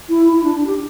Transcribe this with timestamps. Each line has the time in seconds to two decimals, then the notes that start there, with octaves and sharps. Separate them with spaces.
0.09 E4
0.32 E4
0.44 D4
0.55 D4
0.67 G4